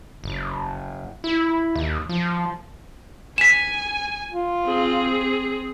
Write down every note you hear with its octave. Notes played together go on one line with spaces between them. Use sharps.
F#1
E4
D#2
F3
G#5 B6 E7
F4
C4 G#4